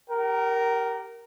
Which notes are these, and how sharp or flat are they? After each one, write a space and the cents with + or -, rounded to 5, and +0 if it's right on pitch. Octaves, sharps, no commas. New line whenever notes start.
G4 +0 A#4 +0 G5 -45